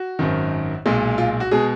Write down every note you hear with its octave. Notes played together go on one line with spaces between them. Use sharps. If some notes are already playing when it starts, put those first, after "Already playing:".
Already playing: F#4
G#1 F#2 D#3
B1 A#2 G#3
F4
F#4
B2 G#3 G#4